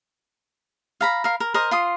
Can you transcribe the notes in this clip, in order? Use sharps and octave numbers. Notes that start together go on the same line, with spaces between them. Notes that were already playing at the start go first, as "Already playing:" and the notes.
F5 A#5 B5
A#4 F5
A#4
A#4 C5 D#5
F4 C6 D#6